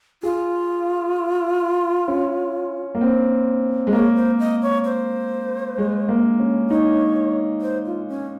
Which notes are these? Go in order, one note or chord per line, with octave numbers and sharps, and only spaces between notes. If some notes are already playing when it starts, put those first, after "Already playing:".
F4 G#4
C#4
A#3
C4
G#3
A#3 C#5
C5
D#5
C#5
C5
G#3
A#3
C#4
D#4 C#5
C5
F4
C#4